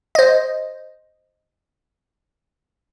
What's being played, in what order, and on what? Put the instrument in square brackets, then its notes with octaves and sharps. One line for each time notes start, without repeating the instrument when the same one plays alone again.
[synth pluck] C5 D#5